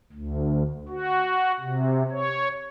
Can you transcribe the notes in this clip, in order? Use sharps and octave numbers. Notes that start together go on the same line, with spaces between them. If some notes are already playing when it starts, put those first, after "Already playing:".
D2
F#4
C3
C#5